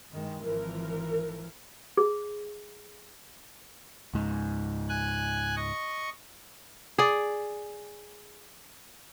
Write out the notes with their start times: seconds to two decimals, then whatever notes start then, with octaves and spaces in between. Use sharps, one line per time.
0.12 G2 D#3 G#3
0.44 G#1 E3 F3 A#4
1.97 G#4
4.14 C#2 G#2
4.89 G#5 F#6
5.56 D#5 C#6
6.98 G#4 D5